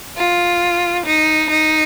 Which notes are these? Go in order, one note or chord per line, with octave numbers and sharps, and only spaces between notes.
F4
D#4
D#4